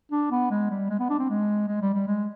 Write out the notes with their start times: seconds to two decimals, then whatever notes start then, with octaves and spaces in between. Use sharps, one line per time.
0.12 D4
0.31 B3
0.51 G#3
0.70 G3
0.90 G#3
1.00 B3
1.10 D4
1.19 C4
1.29 G#3
1.68 G#3
1.81 G3
1.94 G3
2.07 G#3